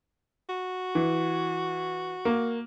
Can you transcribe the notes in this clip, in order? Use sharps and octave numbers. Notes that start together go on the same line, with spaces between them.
F#4
E3
A#3